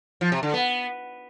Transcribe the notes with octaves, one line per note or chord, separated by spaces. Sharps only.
F3
C3
D3
B3